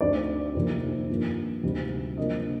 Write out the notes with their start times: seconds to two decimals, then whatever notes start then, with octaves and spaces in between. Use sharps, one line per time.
0.01 D2 D3 A3 C4 D#4 D5
0.55 F2 C3 D#3 A#3
1.09 G2 F3 A#3
1.63 D2 C3 G3 C4 D#4
2.17 C3 F3 A#3 D4 D#5